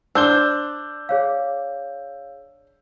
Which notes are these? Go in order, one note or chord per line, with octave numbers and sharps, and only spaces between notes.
D4 C5 E6 G6 G7
G#4 C#5 F5